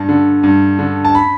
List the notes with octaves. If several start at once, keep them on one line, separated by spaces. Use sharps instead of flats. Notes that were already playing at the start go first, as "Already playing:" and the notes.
Already playing: G2 A5
D3
G2
D3
A5
B5